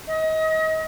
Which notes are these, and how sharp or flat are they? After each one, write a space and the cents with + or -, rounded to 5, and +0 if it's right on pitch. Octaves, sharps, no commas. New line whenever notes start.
D#5 +30